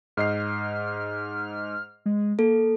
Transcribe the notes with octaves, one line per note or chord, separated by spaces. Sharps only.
G#2 D#5 F6 C7
G#3
A#3 A4